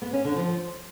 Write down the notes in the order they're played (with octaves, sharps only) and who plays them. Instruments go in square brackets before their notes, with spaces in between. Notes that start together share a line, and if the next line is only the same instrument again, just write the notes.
[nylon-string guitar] B3
C#4
D3
F3